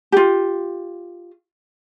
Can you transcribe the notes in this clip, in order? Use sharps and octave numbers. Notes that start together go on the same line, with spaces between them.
F4 G4